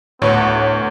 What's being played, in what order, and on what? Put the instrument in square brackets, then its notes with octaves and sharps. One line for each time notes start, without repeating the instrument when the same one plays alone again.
[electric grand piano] D2 [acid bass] A2 [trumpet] B3 [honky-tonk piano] C#5